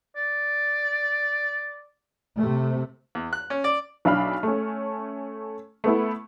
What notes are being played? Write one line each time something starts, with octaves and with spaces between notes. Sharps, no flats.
D5
C3 A3
E2
F#6
C#4
D5
B1 D4 E5 F5 B5 F6
A3 C#4
A3 B3 E4